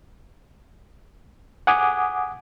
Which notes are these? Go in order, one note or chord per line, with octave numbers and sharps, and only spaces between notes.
F#5 G#5 D6 D#6